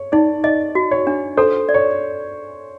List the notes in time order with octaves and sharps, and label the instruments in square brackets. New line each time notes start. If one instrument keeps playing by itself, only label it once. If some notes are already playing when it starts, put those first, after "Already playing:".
Already playing: [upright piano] C#5
[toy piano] D#4 [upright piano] D5
[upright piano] D5 [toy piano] D#5
[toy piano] F#4
[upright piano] C#5
[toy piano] D4
[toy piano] A4 [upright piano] C5
[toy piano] D5
[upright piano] C#5